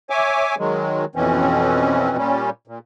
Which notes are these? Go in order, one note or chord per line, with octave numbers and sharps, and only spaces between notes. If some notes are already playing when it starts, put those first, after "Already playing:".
C#5 E5 G#5 D6
D#3 F#3 G#3
F2 B2 E3 C4 C#4
A#2 G3 C#4
A#2